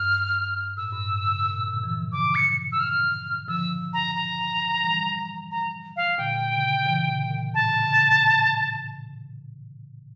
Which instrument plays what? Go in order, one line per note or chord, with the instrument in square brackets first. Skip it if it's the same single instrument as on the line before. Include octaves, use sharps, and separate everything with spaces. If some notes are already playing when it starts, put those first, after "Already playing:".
Already playing: [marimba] G2 [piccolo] F6
[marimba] A2 [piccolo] E6
[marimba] G2
A2
C#3
A#2
A#2 D3
E3
D3 F3
D3
[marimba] C#3 E3 [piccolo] D6
[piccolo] C#7
E6
F6
[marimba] D3 F3 [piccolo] E6
[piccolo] A#5
A#5
[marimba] E3 G3
[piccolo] A#5
F5
[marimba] A#2 D3 [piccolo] G5
[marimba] C#3
C#3 E3
A#2 D3
A#2
[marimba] A2 [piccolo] A5
[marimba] C#3
C#3
A#2
A2